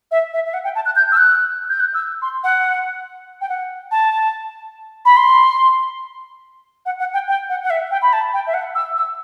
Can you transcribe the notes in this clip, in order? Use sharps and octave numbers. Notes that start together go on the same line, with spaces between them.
E5
E5
E5
F#5
G5
A5
F#6
G6
E6
F#6
G6
F#6
E6
C6
F#5
G5
F#5
A5
B5
C6
F#5
F#5
G5
G5
F#5
F#5
E5
G5
B5
A5
G5
E5
F#5
E6
E6